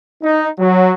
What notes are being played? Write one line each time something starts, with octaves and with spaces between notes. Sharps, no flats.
D#4
F#3